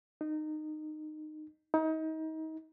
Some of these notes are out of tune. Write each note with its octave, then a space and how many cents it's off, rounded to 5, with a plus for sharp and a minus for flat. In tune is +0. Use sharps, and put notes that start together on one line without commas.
D#4 -20
D#4 +30